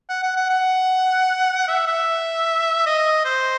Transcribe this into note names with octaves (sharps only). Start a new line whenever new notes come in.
F#5
F#5
F#5
F#5
E5
E5
D#5
C5